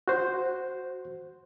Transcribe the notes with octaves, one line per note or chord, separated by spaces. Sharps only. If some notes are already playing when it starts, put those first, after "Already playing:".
F#4 C5